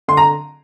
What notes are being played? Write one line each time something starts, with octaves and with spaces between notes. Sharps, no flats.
D3 C6
A#5